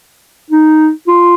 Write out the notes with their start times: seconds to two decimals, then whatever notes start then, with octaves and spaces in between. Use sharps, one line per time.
0.50 D#4
1.07 F4